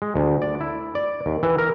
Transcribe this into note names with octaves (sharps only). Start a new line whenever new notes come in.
G#3
D2
D5
E4
D5
D#2
E3
A#4